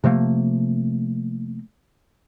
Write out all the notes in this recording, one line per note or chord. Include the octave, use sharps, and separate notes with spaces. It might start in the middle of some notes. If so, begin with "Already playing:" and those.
C3 F3 A3 A#3